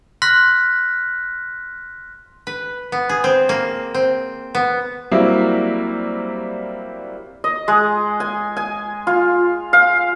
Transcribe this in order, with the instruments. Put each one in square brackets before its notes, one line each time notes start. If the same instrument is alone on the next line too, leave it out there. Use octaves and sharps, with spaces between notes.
[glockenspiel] C6 F6 F#6 A#6 B6
[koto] B4
B3
G#4
C4
A#3
C4
B3
[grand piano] F#3 G3 A#3 C4 E4
[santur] D#5
G#3
G#5
G#5
F4
F5